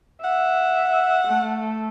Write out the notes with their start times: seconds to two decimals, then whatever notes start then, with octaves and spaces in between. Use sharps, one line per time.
0.24 E5 F#5
1.28 A3